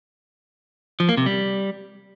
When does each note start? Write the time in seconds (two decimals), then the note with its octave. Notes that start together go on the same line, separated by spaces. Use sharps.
1.00 F3
1.09 A#3
1.17 C3
1.26 G3